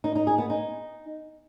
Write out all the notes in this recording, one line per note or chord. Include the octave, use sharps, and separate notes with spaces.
D#4
D#4
G#4
B3
D#4